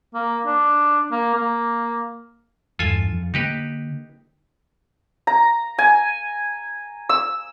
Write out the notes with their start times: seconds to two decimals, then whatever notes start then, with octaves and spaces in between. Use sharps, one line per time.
0.14 A#3
0.46 D4
1.12 A#3
1.34 A#3
2.79 E2 G2 F4 A4 G#5
3.08 F2
3.34 D3 G#3 A#3 D#4 G4 B4
5.27 A#5
5.78 G#5
7.09 E6